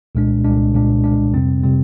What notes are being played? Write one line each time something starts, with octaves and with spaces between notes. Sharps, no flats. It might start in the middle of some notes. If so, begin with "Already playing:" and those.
C2 A#2 G#3 D4
C2 A#2 G#3 D4
C2 A#2 G#3 D4
C2 A#2 G#3 D4
F2 C3 G3 C4
C3 G3 C4